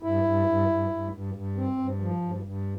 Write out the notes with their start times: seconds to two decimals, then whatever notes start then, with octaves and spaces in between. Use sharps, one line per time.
0.02 G2 E4
0.23 G2
0.47 G2
0.68 G2
0.89 G2
1.12 G2
1.34 G2
1.56 C4
1.78 G2
2.00 F3
2.22 G2
2.43 G2